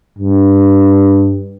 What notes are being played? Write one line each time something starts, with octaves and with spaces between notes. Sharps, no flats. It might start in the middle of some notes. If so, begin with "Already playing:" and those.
G2